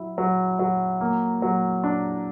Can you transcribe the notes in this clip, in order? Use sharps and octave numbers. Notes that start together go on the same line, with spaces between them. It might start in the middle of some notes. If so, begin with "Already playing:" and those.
Already playing: F#3 E4
F#3
F#3
A#3
F#3
D4